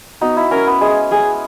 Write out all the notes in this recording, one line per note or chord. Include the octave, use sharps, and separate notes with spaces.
B3 D#4 F#4
E4
C#4 A#4
B3
G#3 G#4
G#4